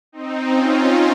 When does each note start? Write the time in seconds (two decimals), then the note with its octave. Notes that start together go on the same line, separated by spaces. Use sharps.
0.12 C4 D#4
0.50 C#4 F4